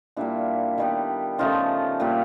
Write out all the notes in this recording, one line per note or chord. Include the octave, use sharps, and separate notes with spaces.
A#2 G3 A#3 D4 E4
D#3 G3 B3
C#3 F3 A3 D#4 F4
A#2 G3 A#3